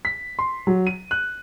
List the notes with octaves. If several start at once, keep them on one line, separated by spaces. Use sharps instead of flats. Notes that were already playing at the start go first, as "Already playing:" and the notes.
B6
C6
F#3
D#7
F#6